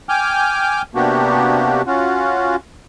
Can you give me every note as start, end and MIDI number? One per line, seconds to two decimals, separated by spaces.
0.09 0.82 79
0.09 0.82 80
0.09 0.82 86
0.09 0.82 89
0.09 0.82 91
0.95 1.82 48
0.95 1.82 58
0.95 1.82 59
0.95 1.82 62
0.95 1.82 66
0.95 1.82 67
1.87 2.56 61
1.87 2.56 65
1.87 2.56 66